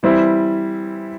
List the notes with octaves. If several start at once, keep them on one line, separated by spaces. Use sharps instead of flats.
E3 G3 C4 E4